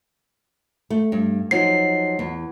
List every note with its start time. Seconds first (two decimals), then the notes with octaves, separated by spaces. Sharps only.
0.90 A3
1.12 G2
1.51 F3 F#3 D#4 C7
2.19 E2